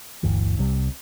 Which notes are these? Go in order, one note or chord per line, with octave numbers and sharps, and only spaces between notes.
G1 D2 E3
C2 C3 G3